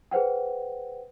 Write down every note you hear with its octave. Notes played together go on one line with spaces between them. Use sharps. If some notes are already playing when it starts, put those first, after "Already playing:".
G#4 B4 C5 F#5 G5